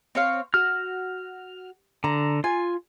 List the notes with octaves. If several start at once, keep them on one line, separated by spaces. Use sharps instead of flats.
C4 C#5 F5
F#4 F6
D3 A#5
F4 G#5